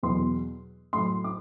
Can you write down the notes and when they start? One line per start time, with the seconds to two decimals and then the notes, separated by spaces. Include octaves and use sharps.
0.03 E2 B2 F#3 C6
0.93 A2 F#3 A3 C6
1.24 D6